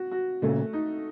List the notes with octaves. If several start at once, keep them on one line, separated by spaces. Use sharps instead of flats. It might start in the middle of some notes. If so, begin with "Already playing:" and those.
Already playing: F#4
F#4
A#2 C#3 A3
D#4